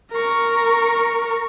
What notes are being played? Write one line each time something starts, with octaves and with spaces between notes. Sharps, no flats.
A#4 C#6